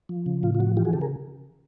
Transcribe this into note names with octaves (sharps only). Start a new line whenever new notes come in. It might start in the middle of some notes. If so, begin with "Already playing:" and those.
F3
C#3
A2 F4
F4
F3 F#4
E3 F4 G4
F#4 G#4
C#3 G4 A4
G#4 A#4